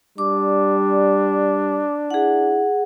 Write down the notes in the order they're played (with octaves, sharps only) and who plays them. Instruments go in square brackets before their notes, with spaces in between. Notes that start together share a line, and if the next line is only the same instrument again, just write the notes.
[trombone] G3 [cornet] D4 [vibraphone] D6
[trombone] E4 [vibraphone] G#4 F#5